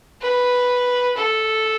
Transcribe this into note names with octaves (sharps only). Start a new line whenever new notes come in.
B4
A4